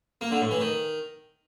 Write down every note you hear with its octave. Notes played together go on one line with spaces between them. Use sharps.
A#3
D3
A2
E3
D#3